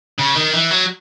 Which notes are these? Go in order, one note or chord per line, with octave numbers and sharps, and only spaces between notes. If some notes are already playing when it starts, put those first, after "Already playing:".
C#3
D#3
E3
F#3